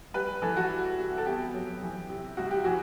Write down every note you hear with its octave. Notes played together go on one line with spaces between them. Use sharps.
G3 B4
E3 A4
F#4
G3
C3
A4
B3 G4
F#3
E3
C3
C2 F#4
G4
E3 F#4